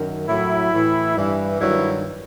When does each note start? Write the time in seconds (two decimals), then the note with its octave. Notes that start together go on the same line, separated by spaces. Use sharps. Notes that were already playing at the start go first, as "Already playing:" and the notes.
Already playing: F#2 D#3
0.27 A2 F#3 E4
0.71 A2 E3
1.16 G2 E3
1.60 G2 D#3 F#3 E4